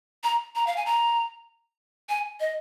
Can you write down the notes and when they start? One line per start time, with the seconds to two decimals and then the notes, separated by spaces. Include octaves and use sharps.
0.24 A#5
0.55 A#5
0.67 F5
0.76 G#5
0.86 A#5
2.09 G#5
2.40 D#5